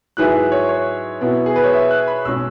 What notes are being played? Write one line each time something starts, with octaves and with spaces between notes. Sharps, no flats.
G#2 F#3 E4 G#4 B4 F#6
E5
C#5
C#5
B2 B3 E4
G#4
B4
C#5
E5
F#6
B5
B1 B2 G#3 C#4 E6